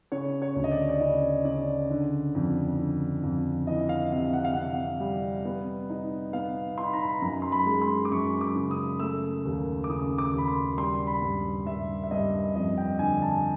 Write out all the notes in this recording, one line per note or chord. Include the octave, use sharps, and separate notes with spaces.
C#3 C#5
C#5
D2
D#5
D5
D5
C#3 D#5
C#3 D5
D3
F2
D3
F2
E3 D#5
F5
C3 F5
F#5
F5
C3 F#5
G3
B3
D#4
B3 F5
D#4 C6
B5
A#5
B5
F#2 A#5
C6
B5
G#3
C6
D6
F#2 C#6
D6
C#3
D#6
A3 E6
D#2
D6
C#3 D#6
D6
D#2
B5
C6
G3 C6
B5
G2
G2 E5
E5
G2 D#5
F2 D#5
G5
D3 G#5
A5
G#5